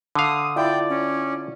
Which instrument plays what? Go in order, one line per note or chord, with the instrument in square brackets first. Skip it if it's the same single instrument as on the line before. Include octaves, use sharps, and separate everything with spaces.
[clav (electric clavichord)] D3 F5 [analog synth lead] D#6
[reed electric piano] E4 F4 [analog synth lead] D5 [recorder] G5
[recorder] C#4